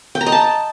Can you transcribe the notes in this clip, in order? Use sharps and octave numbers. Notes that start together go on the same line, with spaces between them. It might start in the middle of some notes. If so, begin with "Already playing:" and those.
G5
A#5
D#5
A5